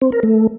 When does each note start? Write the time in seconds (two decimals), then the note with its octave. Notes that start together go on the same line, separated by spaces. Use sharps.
0.02 C4
0.12 A#4
0.23 A3